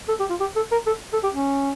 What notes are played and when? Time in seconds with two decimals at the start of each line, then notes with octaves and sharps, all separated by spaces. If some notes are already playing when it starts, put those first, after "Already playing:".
0.08 A4
0.20 G4
0.30 F4
0.40 G4
0.56 A4
0.71 A#4
0.86 A4
1.13 A4
1.23 G4
1.34 C#4